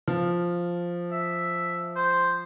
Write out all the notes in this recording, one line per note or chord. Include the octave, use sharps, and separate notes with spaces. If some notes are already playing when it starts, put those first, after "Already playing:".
F3
E5
C5